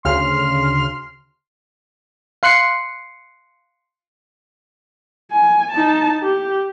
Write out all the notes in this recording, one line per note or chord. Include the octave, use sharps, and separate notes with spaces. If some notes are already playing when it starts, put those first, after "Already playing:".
D2 C#3 C6 F6
F5 C6 F#6 C7 C#7
G#5
D#4 A5
G4